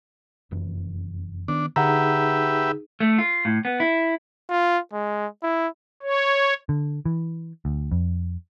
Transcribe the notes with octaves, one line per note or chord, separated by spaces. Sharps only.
F1 F#2 E3
D#3 B3 D4
D3 D#4 G4 G#4 B4 E5 F#5 A#5
A3
F4
A2
B3
E4
F4
G#3
E4
C#5
D3
E3
D2
F2